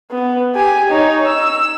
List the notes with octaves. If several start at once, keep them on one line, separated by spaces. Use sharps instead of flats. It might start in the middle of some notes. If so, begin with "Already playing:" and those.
B3
G4 G#5
D#4 C#5
E6